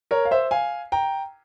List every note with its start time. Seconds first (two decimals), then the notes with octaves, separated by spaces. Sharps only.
0.11 A#4 C#5
0.25 F5
0.31 C5 E5
0.51 F5 G#5
0.92 G5 A#5